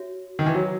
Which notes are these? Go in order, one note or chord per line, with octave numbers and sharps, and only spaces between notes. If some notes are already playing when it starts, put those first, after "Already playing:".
Already playing: F#4 C#5 E5
D#3
E3
F#3 F#4 C#5 E5